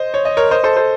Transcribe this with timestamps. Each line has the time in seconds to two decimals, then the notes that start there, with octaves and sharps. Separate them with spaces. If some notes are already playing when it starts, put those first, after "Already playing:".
Already playing: C5 D#5
0.14 C#5
0.25 D#5
0.37 A#4 C#5
0.51 C5 D#5
0.64 A4 C5
0.76 A4 C5